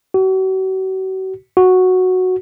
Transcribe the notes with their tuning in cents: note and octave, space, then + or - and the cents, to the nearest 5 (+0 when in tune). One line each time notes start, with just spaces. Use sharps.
F#4 +40
F#4 -5